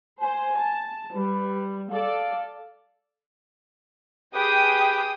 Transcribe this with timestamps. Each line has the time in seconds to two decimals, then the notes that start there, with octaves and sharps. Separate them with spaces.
0.20 C5 G#5
0.56 A5
1.14 G3 B4
1.91 A4 D5 F5
4.34 G4 G#4 B4 G5 D#6